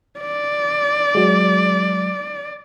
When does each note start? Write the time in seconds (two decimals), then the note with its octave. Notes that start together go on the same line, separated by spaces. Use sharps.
0.20 D5
1.15 F#3 G#3